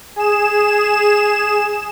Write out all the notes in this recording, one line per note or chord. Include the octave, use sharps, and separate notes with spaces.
G#4 E7